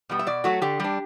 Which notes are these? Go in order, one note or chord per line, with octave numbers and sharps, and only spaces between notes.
B2 G3 B3
E5
B2 D5
F#3 A3 F#4
D3 G4
G3 D4